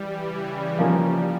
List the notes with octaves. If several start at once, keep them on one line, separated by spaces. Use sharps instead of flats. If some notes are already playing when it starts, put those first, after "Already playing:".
Already playing: E3 G3
C#3
E3
F3 G3 A#3 C#4